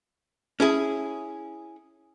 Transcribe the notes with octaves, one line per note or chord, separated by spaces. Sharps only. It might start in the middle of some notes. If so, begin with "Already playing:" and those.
C#4 E4 G#4